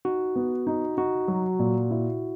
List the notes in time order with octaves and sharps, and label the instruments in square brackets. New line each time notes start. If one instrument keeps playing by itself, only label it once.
[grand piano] D#4 [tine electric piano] F#4
[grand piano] B3
D#4
[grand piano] D#4 [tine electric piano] F#4
[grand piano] F#3
A#2
E4